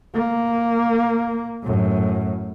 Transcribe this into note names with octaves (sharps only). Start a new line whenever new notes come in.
A#3
F#2 A2